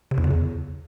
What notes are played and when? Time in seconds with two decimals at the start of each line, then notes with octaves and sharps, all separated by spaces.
0.11 C3
0.18 E2
0.24 C#3
0.31 E2